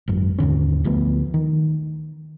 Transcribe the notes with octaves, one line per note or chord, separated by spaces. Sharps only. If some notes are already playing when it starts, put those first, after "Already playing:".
G#1 F#2
D#2 G#2 D3 C#4
D2 F3 A3 B3
D#3